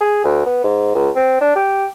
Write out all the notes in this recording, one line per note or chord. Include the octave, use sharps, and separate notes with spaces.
G#4
D2
B3
G#2
C#2
C4
D4
G4